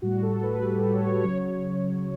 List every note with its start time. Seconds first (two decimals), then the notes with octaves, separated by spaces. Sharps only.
0.02 A2 G3 F#4
0.22 A4
0.43 B4
0.63 G4
0.78 A4
0.93 C#5
1.08 C#5
1.23 C#3 F#3 C#5
1.38 C#5